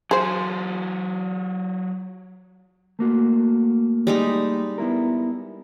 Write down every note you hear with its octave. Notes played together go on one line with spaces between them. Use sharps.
F#3 F4 G#4 C5
A3 A#3 F#4
G3 G#3 D#4
B3 E4 A#4